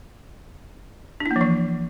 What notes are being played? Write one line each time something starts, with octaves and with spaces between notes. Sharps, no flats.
D4
E4
A#3
F3
E3